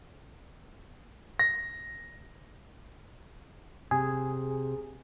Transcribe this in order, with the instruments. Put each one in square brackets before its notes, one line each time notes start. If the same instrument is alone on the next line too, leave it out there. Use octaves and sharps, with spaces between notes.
[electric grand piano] A#6
[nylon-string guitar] C3 [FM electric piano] G#4